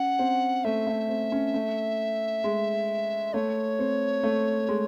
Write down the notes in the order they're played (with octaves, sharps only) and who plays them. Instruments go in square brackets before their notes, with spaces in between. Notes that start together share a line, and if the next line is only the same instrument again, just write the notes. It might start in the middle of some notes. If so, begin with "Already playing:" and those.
Already playing: [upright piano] C#4 [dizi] F#5
[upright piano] C4
[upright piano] A3 [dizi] E5
[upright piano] A3
C4
C#4
A3
G#3
[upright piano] A3 [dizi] C#5
[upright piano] C4
A3
G#3